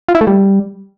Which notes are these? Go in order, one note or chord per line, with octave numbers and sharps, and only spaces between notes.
F4
E4
A3
G3